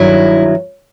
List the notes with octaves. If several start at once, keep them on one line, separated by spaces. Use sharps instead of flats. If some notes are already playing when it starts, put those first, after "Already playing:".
Already playing: G2 D#3 F#3 E4